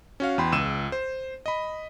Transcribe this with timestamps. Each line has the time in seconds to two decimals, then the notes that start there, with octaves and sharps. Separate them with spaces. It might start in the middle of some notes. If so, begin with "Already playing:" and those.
0.20 C#4 F#4 F5
0.38 E2 G5 B5 C6
0.52 C#2 E6 D#7 E7
0.92 C5
1.46 D#5 B5